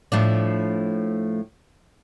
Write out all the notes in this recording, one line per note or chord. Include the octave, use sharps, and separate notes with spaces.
A2 F3 D4